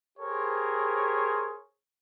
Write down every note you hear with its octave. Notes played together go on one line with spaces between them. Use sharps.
G4 G#4 A#4 C5 C#5